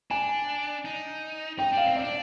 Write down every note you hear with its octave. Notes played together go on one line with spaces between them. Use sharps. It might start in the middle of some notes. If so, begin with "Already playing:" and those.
D4 G#5
D#4
D#4 G5
D4 F5
C4
D4 D5